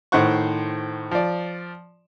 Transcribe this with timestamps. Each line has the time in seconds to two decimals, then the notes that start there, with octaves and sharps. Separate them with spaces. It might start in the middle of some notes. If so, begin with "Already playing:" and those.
0.12 A2 D#3 C5 F#5 C#6
1.11 F3 D5